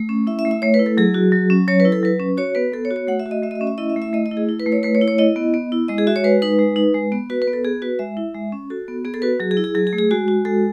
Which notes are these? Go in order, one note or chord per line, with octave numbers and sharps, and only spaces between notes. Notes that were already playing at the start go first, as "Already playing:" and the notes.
Already playing: A3
C#4
E4 E5
E5
A3
E5
A3 C#5
B4
E4
A4
F#3 G#4
F#4
F#3
C#4
F#3 C#5
B4
E4
A4
F#3 B4
C#4
F#4 C#5
B3 B4
B3 A4
C#5
F#4
C#5
A3 F#5
E5
F#4
D#5
A3 E5
D#5
E5
C#4
E5
E4 D#5
E5
A3
E5
A3 D#5
D#5
E4
G#4
E4
B4
A3
C#5
A3 B4
C#5
E4
C#5
E4 D#5
B3
B3
E4
G#3 D#5
G#4
F#4 E5
C#5
G#3 B4
D#4 B4
G#3
D#4
G#3
B3
F#4 B4
B4
B3
A4
B3 G#4
F#4 B4
G#3 E5
E4
G#3
C#4
F#4 A4
B3
B3 G#4
A4
F#4 B4
F#3 G#4
G#4
E4
G#4
F#3 G#4
G#4
A3
G#4
G#3 F#4
F#4
G#3 A4